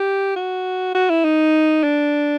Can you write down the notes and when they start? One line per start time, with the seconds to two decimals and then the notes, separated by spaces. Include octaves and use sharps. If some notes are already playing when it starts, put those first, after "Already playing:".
Already playing: G4
0.36 F#4
0.94 F#4
1.10 E4
1.24 D#4
1.83 D4